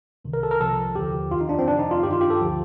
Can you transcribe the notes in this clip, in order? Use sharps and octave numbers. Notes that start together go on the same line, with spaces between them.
C2 C3 D#3
A#4
A4
A#4
C2 C3 F3 A4
D#2 D3 F3 G4
F2 D#3 F4
D#4
D4
C4
F2 C3 F3 D4
D#4
F4
G2 D#3 G4
F4
G4
A4
D2 D3 F3